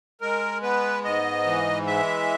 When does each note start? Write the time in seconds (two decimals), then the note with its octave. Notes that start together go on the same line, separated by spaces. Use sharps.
0.21 G#3 A#4
0.62 B3 B4
1.04 G#2 D#5
1.46 E3
1.86 G#3 E5